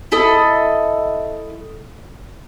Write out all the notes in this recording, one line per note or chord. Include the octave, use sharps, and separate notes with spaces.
E4 A4 D#5